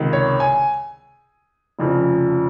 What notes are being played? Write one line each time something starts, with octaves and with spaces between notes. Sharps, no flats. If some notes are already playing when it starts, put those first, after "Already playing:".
Already playing: C#2 C3 D#3
C#5
G#5
F1 F2 C#3 F3